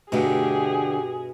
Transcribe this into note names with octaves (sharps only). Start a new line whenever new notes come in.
G2 B2 D3 A3 G4 G#4